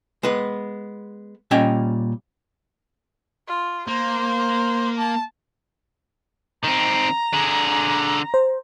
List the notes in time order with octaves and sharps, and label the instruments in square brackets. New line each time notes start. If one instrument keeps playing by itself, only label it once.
[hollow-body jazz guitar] G#3 B3 B4
A#2 G3 C#4 D#5 G5 G#5
[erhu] F4
[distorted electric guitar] A#3 [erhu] C5
[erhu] A5
[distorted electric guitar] D#3 C4 [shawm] A#5
[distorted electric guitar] D3 G#4
[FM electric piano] C5